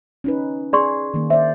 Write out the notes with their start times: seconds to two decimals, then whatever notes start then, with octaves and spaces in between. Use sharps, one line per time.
0.24 C#4 D#4 B4
0.73 G#4 D5 C6 C#6
1.14 D#3 A#3
1.30 C5 D5 E5